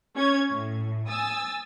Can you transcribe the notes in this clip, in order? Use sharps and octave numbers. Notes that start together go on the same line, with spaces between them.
C#4 C#5 G#6
A2
G#5 D#6 E6 A6